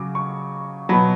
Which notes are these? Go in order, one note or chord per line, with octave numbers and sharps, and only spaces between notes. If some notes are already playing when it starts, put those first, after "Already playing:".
Already playing: C#3 F#3 D6
C#6
B2 F#3 B5